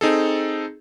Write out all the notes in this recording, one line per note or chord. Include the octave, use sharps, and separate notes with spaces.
C4 D#4 G#4 A4